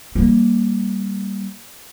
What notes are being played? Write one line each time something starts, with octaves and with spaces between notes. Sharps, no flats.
G3 A#3